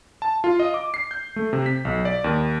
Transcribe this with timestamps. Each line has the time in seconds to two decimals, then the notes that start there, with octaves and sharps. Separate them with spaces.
0.22 A5
0.44 F4
0.59 D#5
0.74 D6
0.94 C7
1.11 G6
1.36 A3
1.53 C3
1.66 B6
1.85 B1
2.05 D5
2.24 D#2